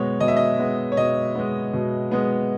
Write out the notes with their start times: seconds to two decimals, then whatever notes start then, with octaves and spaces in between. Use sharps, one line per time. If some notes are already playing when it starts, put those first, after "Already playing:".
Already playing: B2 G#3 B3 C#5
0.20 B2 D#5
0.28 E5
0.37 D#5
0.58 G#3 B3
0.92 C#5
0.97 B2 D#5
1.35 G#3 B3
1.73 B2
2.11 G#3 B3